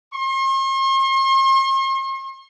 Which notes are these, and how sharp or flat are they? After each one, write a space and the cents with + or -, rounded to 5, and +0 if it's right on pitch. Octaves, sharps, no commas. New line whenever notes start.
C6 +45